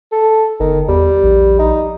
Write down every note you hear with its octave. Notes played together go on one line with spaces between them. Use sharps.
A4
G1 D#3
E2 G3
A#1
D#4